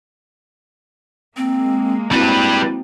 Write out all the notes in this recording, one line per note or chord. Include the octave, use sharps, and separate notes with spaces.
G#3 A#3 C4
G3 C4 E4 F#4 B4